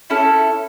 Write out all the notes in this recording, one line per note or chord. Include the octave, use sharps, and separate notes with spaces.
C#4 E4 A4